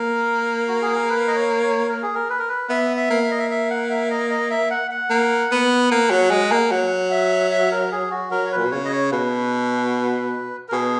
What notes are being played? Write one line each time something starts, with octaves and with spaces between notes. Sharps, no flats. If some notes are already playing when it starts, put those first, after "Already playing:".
Already playing: A#3 A#4
F#4
G#4
A#4
B4
D#5
C#5
C#5
A#4
G#4
A#4
B4
A#4
B4
B3 E5
E5
A#3
E5
D#5
E5
E5
F#5
E5
D#5
D#5
E5
F#5
F#5
A#3
B3
A#3
F#3
G#3
A#3
F#3 F#5
F#5
E5
E5
A#4
G#4
F#4
F#3 A#4
C#5
B4
A#2
B2
C#3 C#5
D#5
C#5
B2 B4
A#4
B2 G#4